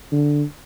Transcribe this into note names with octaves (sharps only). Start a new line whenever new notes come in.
D3